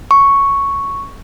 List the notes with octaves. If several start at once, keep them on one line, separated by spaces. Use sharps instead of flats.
C#6